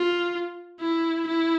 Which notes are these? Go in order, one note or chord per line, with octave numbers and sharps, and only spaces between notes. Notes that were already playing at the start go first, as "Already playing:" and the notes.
Already playing: F4
E4
E4